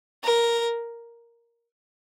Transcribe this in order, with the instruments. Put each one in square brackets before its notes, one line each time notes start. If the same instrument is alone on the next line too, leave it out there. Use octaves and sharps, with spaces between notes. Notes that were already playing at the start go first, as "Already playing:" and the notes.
[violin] A#4